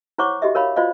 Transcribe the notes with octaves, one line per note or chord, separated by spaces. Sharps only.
E4 C5 C#5 F#5 C#6 D6
F#4 G4 D#5 E5
A#4 C#5 F5 B5
F4 F#4 C5 D5 D#5 F5